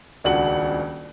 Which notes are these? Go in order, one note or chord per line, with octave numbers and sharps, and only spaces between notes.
D#1 C#2 D4 F#4 F#5 F#7